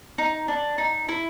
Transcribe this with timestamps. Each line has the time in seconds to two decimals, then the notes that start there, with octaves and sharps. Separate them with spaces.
0.18 D#4
0.48 D4
0.78 D#4
1.09 E4